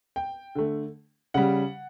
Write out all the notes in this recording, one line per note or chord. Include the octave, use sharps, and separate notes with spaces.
G5
D3 A3
C#3 G3 F#5